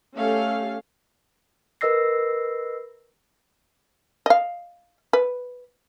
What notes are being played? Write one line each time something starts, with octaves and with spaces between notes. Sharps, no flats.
A3 C#4 G4 A4 F5
A#4 B4 D#5 E6 A#6 C7
D#5 F5
B4